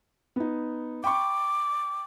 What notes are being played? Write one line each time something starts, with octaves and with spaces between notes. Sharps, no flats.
B3 D#4
G5 B5 C#6 D6